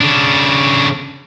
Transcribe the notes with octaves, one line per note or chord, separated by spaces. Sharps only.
C#3 D4